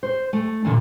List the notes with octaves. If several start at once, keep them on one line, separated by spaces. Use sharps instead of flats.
C5
A3
A#2 D3 E3